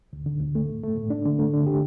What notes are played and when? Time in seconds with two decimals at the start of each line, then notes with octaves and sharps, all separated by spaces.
0.13 D2
0.26 D3
0.40 D2
0.55 A3
0.68 A2
0.83 A3
0.96 A2
1.10 D4
1.25 D3
1.39 A3
1.53 D3
1.67 G4